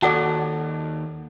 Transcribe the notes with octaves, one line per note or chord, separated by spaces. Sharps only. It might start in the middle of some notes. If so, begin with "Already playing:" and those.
D#2 F#4 A4 D5 F#5 A5